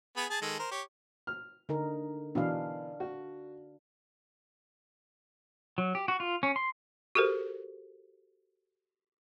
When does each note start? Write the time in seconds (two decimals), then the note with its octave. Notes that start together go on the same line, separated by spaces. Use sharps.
0.17 B3 G#4 B5
0.30 G#4 A5
0.42 D#3 G#3 A4
0.59 A#4 C5
0.71 G4 C#5
1.27 F6
1.69 D3 D#4 A#4
2.35 B2 E3 D4 F5
3.00 F#4
5.78 F#3
5.95 G4
6.08 F#4
6.20 F4
6.43 C#4
6.56 C6
7.15 F#4 G4 A4 A#4 C5